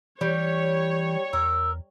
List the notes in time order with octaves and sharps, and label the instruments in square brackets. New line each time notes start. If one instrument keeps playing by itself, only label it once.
[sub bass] E3 [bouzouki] G3 [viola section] C#5
[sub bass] E2 [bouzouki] A#4 [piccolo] E6